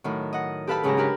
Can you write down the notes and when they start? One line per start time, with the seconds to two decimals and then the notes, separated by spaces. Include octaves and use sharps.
0.04 A2 D#3 F#3
0.33 D#5 F#5
0.67 G4 A4 B4 F5 A5 B5
0.83 G#2 C#3 F#3 G4 G#4 A#5
0.97 D4 G4 A#4 B4